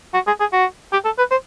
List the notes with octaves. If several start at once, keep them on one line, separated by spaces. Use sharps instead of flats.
F#4
G#4
G#4
F#4
G4
A4
B4
C5